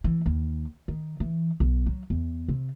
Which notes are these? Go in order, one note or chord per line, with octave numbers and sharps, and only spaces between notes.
E3
D#2
D#3
E3
B1
F#3
E2
C3